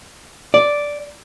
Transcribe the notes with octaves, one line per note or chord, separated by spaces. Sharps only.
D5